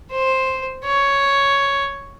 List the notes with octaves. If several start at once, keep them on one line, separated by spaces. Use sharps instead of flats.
C5
C#5